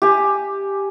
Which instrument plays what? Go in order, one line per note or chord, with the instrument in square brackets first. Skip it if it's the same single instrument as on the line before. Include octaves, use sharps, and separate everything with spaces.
[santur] G4 G#5